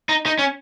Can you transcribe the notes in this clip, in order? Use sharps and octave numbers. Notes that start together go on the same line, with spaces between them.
D#4
D#4
C#4